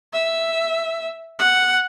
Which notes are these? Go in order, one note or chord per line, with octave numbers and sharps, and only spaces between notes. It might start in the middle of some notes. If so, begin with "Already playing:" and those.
E5
F#5